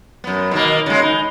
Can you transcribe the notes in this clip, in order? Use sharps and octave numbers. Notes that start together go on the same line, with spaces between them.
F#2 B3
B2 D#3 A#3
C#3 G#3
D#4